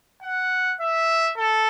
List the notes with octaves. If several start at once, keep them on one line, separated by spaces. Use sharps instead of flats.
F#5
E5
A4